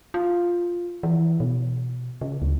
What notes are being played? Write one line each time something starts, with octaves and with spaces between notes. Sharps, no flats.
F4
E3
B2
C#3
D2